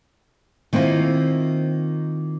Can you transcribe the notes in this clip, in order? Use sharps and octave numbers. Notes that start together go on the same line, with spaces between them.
D#3 A#3 C4 E4 F4